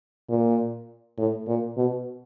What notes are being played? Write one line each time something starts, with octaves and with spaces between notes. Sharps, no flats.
A#2
A2
A#2
B2